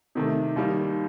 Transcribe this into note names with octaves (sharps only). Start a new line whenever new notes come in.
C3 D#3 A3
D#2 D#3 G3